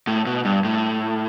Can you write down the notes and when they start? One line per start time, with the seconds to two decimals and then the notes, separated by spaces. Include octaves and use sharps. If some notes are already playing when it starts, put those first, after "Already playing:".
0.07 A2
0.26 B2
0.45 G2
0.64 A2